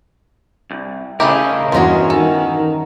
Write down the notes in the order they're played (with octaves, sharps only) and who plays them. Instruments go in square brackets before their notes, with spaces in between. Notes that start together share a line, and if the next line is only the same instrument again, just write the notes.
[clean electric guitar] C2
[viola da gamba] C#3 C#4 [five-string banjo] A3 E4 G4 [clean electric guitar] A#4 D#5
[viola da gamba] E2 G2 [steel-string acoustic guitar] E3 C#4 F#4 [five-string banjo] G#3 F4 A#5
[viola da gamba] D#3 [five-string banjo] A4